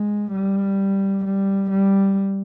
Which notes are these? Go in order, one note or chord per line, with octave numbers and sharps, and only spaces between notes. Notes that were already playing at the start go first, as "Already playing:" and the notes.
Already playing: G#3
G3
G3
G3